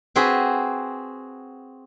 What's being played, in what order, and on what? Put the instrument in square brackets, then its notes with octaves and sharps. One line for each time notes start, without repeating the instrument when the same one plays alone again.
[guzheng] C4 F#4 G#4 B4